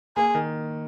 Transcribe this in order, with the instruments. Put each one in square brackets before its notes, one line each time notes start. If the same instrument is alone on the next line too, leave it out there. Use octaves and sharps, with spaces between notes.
[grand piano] A#3 [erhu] G#4
[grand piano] D#3